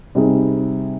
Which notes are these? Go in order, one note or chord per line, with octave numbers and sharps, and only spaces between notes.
C3 G3 C4 D#4 G#4